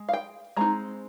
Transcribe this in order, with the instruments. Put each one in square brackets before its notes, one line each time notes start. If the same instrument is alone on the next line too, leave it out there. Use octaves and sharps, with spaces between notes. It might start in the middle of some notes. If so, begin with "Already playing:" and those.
Already playing: [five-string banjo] G#3
F5
G5
G#3 C4 D#4 A#5